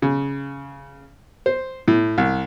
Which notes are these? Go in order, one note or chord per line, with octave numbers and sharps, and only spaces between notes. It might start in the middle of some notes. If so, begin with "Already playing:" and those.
C#3
C5
A2
C2